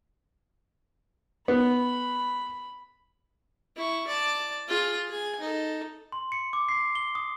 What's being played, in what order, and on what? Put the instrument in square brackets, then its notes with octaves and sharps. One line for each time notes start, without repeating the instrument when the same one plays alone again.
[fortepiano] B3 [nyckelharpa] B5
[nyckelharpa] E4 C#6
D5 A5
F4 G#4
G#4 G#5
D#4 A4
[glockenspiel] C6
C#7
D6
C7
G7
D#6